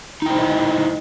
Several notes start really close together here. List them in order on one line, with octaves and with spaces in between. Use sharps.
D#4 G5 C5 E4 D#5